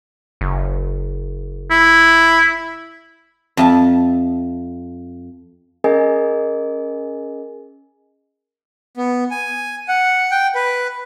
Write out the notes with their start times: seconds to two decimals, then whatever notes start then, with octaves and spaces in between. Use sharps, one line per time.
0.41 F#1
1.71 E4
3.57 F2 E5 A5
5.84 C#4 G#4 A#4 D#5 G#5
8.97 B3
9.31 G#5
9.88 F#5
10.31 G5
10.55 B4